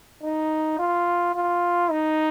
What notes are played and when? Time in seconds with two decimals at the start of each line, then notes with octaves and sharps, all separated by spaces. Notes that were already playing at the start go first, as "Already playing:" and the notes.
0.24 D#4
0.79 F4
1.35 F4
1.91 D#4